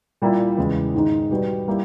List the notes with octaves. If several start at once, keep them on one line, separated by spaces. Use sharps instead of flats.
A#2 G3 A#3 E4 G4
E2 C#3 E3 G#3 B3
G#2 D#3 G#3 D#4
B2 G3 B3 G4
G3 A#3 E4 G4